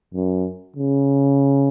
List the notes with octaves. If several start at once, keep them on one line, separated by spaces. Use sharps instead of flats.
F#2
C#3